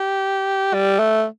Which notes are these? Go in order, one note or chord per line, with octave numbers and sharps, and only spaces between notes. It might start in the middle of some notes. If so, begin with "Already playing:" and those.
Already playing: G4
G3
A3